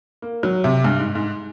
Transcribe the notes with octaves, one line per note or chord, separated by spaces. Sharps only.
A#3
F#3
C3
G2
G#2
G#2